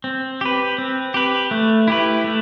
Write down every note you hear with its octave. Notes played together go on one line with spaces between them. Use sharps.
C4
G4 B4
C4
G4 B4
A3
E4 G4 B4
A3